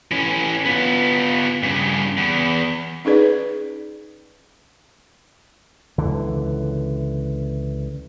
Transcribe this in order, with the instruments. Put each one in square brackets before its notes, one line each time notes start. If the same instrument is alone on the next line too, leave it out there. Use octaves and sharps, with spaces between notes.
[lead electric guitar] E3 C#4
B3 F4
G2 C#3
E2
[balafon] C#4 D#4 G#4 B4 D5
[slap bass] C#2 D3 E3